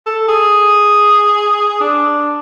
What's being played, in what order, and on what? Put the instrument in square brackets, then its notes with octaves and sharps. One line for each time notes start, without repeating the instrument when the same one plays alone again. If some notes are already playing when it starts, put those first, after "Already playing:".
[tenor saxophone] A4
G#4
D4